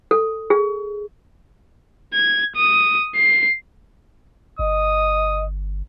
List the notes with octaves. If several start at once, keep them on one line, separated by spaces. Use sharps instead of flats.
A4
G#4
G#6
D#6
C7
G1 D#5 D#6